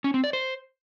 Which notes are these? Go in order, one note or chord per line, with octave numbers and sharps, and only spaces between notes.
C#4
C4
D5
C5